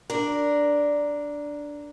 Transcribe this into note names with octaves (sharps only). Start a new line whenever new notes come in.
D4 A#4